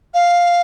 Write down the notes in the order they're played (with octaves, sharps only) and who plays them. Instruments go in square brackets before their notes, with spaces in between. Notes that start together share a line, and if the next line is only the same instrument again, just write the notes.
[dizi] F5